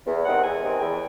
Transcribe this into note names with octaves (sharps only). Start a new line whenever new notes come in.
E2
C3 D#3 G#3 C4 F#5
E2 G#5
C3 D#3 G#3 C4
E2 G5